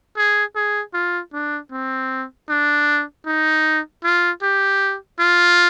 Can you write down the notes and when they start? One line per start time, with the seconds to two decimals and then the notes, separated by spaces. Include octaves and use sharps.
0.17 G#4
0.56 G#4
0.94 F4
1.33 D4
1.72 C4
2.49 D4
3.26 D#4
4.04 F4
4.42 G4
5.19 F4